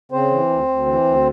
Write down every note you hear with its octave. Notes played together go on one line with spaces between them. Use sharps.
C#3 C4 C5
E3
D2
D2
E3
D2